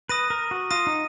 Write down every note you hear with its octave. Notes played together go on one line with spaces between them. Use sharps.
B4 D#6 A#6 D#7
A#4
F#4
F4 D#6 A#6 D#7
D#4